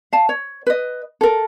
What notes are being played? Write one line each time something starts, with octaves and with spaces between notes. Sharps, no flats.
F5 A5
C#5
B4 D#5
A4 A#4